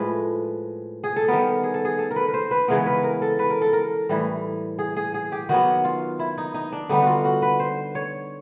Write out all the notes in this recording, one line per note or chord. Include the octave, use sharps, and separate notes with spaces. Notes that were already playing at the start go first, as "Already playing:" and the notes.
Already playing: A2 F3 G#3 B4
G#4
A4
D#3 G3 B3 A#4
G#4
A4
G#4
A4
A#4
B4
B4
C5
B4
C#3 E3 G#3 B3 A#4
B4
A#4
A4
B4
A#4
A4
A#4
A2 E3 G3
G#4
G#4
G#4
G4
D#3 F#3 B3 F#4
F4
E4
D#4
D#4
D4
D3 G3 B3 D#4
F4 F#4
F#4
B4
C5
C#5